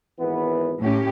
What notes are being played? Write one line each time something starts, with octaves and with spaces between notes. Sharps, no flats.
G#1 E3 B3
A2 C#4 G4